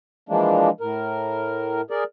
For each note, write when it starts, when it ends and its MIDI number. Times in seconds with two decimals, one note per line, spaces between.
0.29 0.70 52
0.29 0.70 53
0.29 0.70 56
0.29 0.70 58
0.29 0.70 62
0.81 1.81 45
0.81 1.81 70
1.90 2.04 68
1.90 2.04 70
1.90 2.04 74